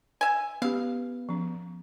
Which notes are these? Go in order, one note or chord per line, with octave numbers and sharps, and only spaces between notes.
E5 G#5
B3 C#4 G4 F5
F3 C#4